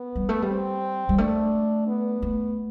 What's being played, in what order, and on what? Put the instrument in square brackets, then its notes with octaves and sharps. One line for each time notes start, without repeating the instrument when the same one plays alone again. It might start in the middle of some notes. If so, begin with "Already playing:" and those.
Already playing: [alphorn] B3
[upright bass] G3
A3
G3
[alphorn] C4
[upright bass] G3
[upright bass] A3 [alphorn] D4
[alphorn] B3
[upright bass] A3